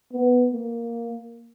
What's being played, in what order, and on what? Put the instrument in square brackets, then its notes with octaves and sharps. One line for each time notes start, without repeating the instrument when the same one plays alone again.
[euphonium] B3
A#3